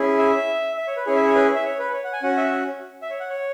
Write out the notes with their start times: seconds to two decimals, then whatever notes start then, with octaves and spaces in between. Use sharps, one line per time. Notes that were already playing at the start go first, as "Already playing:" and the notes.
Already playing: C#4 E4 G#4
0.19 E5
0.77 E5
0.87 C#5
0.96 B4
1.06 C#4 E4 G#4 C#5
1.16 E5
1.26 C#5
1.35 B4
1.55 E5
1.65 C#5
1.79 B4
1.93 C#5
2.04 F#5
2.13 G#5
2.22 C#4 F#4 F#5
2.37 E5
3.02 E5
3.10 C#5
3.20 F#5
3.30 C#5